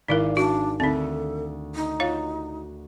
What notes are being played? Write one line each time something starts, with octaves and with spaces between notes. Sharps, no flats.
G#1 D#4 E4 A#4 D5 F5
D4 F#4
D2 C4 D#4 A4
D#4
F4 F#4 C#5 F5